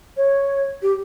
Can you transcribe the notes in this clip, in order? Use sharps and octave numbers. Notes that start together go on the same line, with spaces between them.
C#5
G4